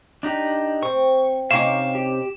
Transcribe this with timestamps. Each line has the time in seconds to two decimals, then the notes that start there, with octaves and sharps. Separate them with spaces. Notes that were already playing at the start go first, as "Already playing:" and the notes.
0.23 D4 D#4 G4
0.83 C4 C#6
1.51 C3 C#4 D#4 F5 C#6 D6 E7
1.95 G4